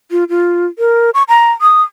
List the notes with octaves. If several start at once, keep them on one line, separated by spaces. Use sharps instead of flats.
F4
F4
A#4
C#6
A#5
D#6